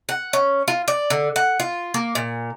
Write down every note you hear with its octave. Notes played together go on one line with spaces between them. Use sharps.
F#5
C#4
F4
D5
D3
F#5
F4
A#3
A#2